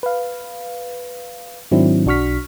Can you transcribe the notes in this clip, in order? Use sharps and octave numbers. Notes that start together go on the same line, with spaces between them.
B4 F5
G#2 D#3 F#3 C4 D4 E4
B1 D4 F#4 C#6 F6 B6